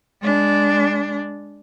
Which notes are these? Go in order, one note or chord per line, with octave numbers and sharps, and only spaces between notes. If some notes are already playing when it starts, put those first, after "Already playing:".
G#3 D4